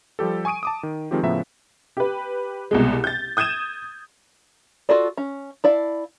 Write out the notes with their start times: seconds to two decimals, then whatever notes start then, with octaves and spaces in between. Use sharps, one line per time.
0.19 F3 G3 G4 A4
0.45 G#5 C#6 D#6 D7 D#7
0.63 A5 D6 D#6
0.83 D#3
1.11 D#3 F3 G#3 C4 F4 G4
1.23 A2 C#3 F3 B3 E5 A#5
1.97 G4 B4
2.71 C2 B2 G#3
3.04 G6 A6
3.37 D#6 G6 G#6 D#7 E7
4.89 F4 F#4 A4 D5
5.18 C#4
5.64 E4 D5 F5 A5